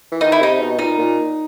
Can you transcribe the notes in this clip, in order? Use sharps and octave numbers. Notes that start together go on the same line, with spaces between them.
E3
D#3 D#4
E4
C3 D#4
B2
A#2 D#4
A#2